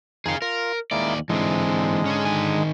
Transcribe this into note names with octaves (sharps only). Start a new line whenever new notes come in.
F2 D#3 G#4 F5
F4 A#4
D#2 G#3 A#3 E4 D5
G#2 D3 E3 G#3 C4
C#4 G#4
D#3 G#5